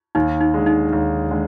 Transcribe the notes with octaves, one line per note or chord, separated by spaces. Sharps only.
D#2 D#4
D#4
D3 G#3
D#4
D#2
D3 G#3